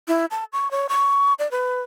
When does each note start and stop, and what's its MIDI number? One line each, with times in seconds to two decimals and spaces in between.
0.08 0.26 64
0.31 0.44 81
0.53 0.71 85
0.71 0.87 73
0.89 1.33 85
1.39 1.50 74
1.51 1.82 71